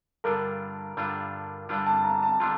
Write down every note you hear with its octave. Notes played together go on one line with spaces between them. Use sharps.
G2 D3 G3 D4 F4 A#4
G2 D3 G3 D4 F4
G2 D3 G3 D4 F4
A5
A#5
A5
D3 G3 D4 F4 C6